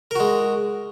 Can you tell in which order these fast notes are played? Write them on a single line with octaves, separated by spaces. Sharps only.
A#4 F#4 G#3